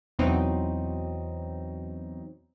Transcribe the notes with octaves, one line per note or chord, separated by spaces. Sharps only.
E2 B2 F#3 C4 D#4